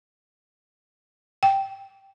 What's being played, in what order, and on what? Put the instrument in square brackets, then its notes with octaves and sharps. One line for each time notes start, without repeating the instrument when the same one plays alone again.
[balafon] G5